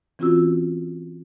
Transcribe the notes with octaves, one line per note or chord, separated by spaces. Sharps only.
E3 C4 C#4 F4 F#4 E6